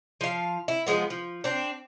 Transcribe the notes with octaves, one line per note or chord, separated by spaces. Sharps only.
F3 F5
E4
F3 F#3 G#3 B3
F3
C4 D4